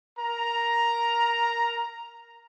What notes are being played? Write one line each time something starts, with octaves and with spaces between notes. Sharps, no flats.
A#4 A#5